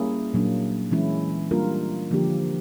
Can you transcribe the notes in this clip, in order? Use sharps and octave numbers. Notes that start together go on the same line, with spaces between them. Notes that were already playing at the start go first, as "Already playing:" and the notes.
Already playing: G3 A#3 C#4 E4 G#4
A#2 F#3 A#3 D4
E3 G#3 C#4 E4
G3 A#3 D4 F4 A#4
D3 F3 A#3 D4 G4